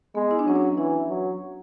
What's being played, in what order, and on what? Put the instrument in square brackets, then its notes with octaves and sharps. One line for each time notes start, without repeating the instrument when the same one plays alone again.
[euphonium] G#3 [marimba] B3
[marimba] E4
D4
[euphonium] F#3 [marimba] C#4
[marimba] D4
[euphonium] E3 [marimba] E4
[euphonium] F#3